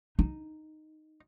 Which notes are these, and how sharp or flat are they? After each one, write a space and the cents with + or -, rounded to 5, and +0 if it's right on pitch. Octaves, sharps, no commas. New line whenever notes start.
D#4 -5